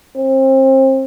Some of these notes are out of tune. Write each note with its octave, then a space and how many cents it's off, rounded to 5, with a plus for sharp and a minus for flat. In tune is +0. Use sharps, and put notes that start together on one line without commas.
C4 +30